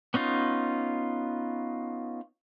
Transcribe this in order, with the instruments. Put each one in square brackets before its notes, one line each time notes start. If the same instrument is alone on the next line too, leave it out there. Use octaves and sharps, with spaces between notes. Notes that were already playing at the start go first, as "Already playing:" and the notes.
[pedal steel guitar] B3 C#4 D#4 F4